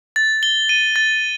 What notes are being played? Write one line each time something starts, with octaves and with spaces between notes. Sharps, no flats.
A6
G7
D#7
A6